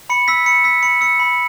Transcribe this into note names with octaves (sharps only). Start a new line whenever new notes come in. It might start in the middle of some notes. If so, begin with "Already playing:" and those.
B5 C#7
E6 B6
B5 C#7
E6 B6
B5 C#7
E6 C#7
B5